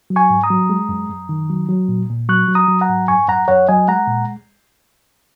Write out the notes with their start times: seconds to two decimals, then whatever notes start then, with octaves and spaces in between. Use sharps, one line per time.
0.10 F#3
0.16 G#5 C#6
0.30 G#2
0.43 A#5 D#6
0.50 F#3
0.70 G#3
0.89 F#2
1.09 F#2
1.29 D#3
1.50 F#3
1.69 F#3
1.88 A#2
2.09 A#2
2.29 F#3 C#6 F#6
2.48 F#3
2.55 A#5 D#6
2.68 F#3
2.81 F#5 A#5
2.89 G#2
3.08 F#2 G#5 C#6
3.29 F#2 F#5 A#5
3.48 F#2 C#5 F#5
3.68 F#3 D#5 G#5
3.88 G#3 F#5 A#5
4.08 A#2